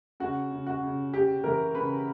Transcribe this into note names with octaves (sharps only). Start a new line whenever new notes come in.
C#3 F#4
C#3
F#4
C#3
C#3 G4
E3 A#4
C#3 B4